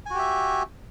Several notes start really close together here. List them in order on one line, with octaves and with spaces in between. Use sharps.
G#5 F#4 G4 E5